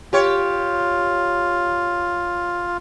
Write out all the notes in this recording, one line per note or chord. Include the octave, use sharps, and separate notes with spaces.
F4 G4 C#5